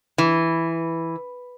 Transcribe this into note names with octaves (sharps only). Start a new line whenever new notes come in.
E3